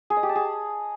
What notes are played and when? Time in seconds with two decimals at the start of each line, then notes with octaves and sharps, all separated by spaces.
0.10 G#4
0.17 D#5
0.23 G4
0.29 A5
0.36 G#4